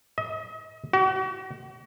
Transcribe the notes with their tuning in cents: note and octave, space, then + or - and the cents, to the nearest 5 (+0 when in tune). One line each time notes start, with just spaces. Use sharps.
D#5 +40
F#4 +40